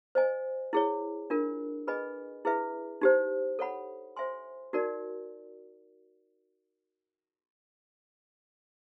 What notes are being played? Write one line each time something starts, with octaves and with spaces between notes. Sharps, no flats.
C5 D#5 G#5
E4 G#4 C#5
D4 F4 A#4
G#4 B4 D#5 G#5 B5
E4 G#4 B4 E5
D#4 G4 C5
A4 C#5 F#5 B5
C5 E5 G#5 C6
D#4 F#4 A#4 D5